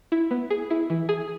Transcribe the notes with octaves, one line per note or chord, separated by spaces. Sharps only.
E4
B3
G#4
E4
E3
G#4